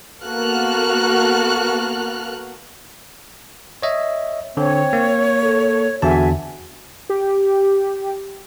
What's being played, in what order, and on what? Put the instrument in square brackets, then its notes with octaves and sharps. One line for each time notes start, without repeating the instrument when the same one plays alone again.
[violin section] A#3 B3 F#4 A4 F6 F#6
[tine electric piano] C#5 D#5 E5
[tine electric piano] D3 [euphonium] C4 [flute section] C#5
[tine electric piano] A#3
[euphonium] A4
[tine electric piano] E2 D3 A5 [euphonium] F#4 [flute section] E5 G#5
[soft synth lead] G4